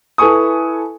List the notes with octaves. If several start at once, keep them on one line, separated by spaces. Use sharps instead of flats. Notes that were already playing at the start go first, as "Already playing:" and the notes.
E4 A4 B4 G#5 C#6 D#6